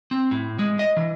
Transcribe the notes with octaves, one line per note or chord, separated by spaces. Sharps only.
C4
A2
G#3
D#5
E3